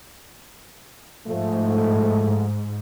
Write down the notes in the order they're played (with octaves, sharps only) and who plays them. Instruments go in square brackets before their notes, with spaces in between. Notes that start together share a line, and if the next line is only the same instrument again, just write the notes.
[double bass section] G#2 [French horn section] F3 A3